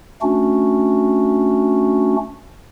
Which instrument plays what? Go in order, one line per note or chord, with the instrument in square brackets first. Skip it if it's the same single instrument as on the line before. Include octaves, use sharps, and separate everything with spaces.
[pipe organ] A3 C#4 D4 F#4